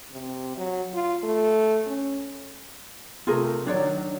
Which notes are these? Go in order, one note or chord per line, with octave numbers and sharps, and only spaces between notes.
C3
F#3
F4
A3
C#4
C3 A3 F4 G#4 A#4
D#3 F#3 D4 C#5 D5